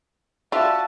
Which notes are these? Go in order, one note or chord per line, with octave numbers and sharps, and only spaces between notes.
D4 F4 F#4 E5 A5